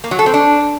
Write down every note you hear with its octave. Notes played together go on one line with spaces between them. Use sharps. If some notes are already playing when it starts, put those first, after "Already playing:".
A#3
F#3
A4
C4
D4